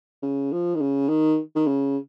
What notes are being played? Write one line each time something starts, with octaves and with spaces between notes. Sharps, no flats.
C#3
F3
D#3
C#3
D#3
D#3
C#3